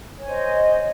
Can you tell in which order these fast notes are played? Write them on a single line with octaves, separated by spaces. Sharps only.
C#5 G#5 C5 D#5